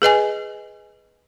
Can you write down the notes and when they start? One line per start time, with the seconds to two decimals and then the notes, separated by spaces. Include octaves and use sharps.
0.02 G#4 B4 D#5 G#5